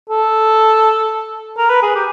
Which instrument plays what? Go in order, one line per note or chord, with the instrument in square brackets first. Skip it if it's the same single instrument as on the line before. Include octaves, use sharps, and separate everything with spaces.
[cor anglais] A4
A#4
B4
G#4
G4